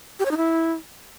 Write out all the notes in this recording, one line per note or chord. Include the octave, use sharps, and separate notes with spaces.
G4
C#5
D#4
E4